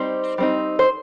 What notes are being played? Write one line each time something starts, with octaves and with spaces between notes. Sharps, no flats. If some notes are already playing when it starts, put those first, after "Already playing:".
Already playing: G3 C4 D#4 C5
G3 C4 D#4
C5